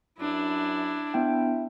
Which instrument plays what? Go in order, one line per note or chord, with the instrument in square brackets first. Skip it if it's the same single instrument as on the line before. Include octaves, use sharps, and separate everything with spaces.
[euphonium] F#2 [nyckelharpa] D4 E4
[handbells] B3 D4 G5 [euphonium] E4